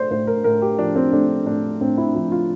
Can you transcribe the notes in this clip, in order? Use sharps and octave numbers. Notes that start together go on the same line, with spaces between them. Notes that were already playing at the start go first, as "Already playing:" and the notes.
Already playing: A3 C5 D5
A2 C5
A#4
A2 A#4
G4
F3 D4
C4
A3 D4
A2 D4
A2 C4
E4
F3 E4
F4